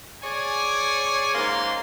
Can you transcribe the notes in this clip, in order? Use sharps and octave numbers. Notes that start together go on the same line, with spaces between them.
G#4 C#5 D5 G#5
G#2 A#3 C#4 C6